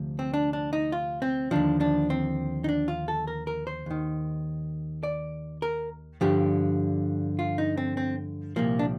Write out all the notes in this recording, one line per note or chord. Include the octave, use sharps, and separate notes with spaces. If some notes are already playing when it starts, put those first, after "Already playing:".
Already playing: D2 C3 F3
C4
D4
D4
D#4
F4
C4
D#2 D3 F3 D4
D4
C4
D#4
D4
F4
A4
A#4
A#4
C5
D#2 D#3
D5
A#4
G2 D3 F3 G4
F4
D#4
C4
C4
C2 A#2 F3 A#3
D4